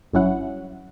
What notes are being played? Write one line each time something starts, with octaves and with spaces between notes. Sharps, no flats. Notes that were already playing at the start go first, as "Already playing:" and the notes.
G#1 G2 F#3 C#4 E4 F#5